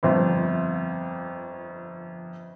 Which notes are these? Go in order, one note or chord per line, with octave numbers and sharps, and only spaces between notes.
G1 F2